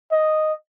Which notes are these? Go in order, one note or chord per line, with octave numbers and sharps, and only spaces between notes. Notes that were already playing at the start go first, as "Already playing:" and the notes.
D#5